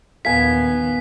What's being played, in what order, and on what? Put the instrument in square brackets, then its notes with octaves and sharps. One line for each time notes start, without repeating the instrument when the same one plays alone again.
[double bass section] A#1 D#2 D#3 [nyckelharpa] B3 [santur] F5 G#5 [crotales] B6